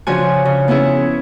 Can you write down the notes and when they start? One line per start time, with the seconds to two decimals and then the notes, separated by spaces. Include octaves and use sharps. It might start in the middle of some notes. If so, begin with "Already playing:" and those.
0.07 C#3 F3 D4 F4 F#4 G#5
0.45 C#3
0.68 B3 C#4 E4 G#4